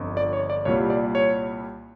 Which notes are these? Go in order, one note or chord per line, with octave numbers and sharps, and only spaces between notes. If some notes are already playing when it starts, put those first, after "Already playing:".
Already playing: G1 F2 D3
D5
C#5
D5
C2 A#2 G3 C#5
D5
C#5